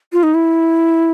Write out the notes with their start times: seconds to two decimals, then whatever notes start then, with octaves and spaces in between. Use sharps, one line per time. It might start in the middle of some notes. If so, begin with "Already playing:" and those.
0.13 F4
0.23 D#4
0.34 E4